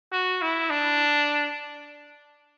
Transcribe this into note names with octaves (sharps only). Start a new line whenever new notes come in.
F#4
E4
D4